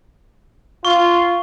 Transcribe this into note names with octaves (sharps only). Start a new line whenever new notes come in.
F4 C#6